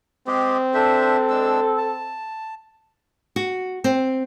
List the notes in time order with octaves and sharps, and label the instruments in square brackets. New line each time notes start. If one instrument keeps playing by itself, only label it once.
[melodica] G#3 G4 G#4 [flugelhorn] C4
[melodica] D4 C5 E5 [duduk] A4
[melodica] G#3 D4 E6
A5
[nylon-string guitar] F#4
C4